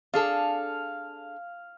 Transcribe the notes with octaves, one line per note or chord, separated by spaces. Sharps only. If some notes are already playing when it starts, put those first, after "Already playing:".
D4 G#4 A4 F5